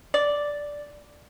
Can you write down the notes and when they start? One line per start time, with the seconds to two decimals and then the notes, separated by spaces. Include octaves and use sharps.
0.14 D5